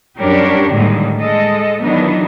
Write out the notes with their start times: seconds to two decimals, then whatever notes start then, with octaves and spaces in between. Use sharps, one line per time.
0.20 F#2 G3 D4 G4 A#4 C#5
0.73 A2 D3 D#3 G3 G#3 A#3
1.18 G#3 A4 D#5
1.82 D#3 E3 F#3 B3 D4 D#4